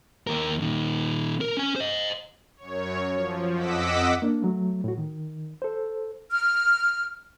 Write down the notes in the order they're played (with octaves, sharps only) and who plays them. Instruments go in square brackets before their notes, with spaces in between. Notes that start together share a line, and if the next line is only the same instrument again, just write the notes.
[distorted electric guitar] D#2 A#4
A#2 D#3
A#4
C#4 G#5
C5 D#5
[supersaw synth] F#2 C#5
F3
F2 D#5 F#5 D6 E6 B6
[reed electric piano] A#3 D4
F#3 A3
A2 F#4
D#3
A4 C5
[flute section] F6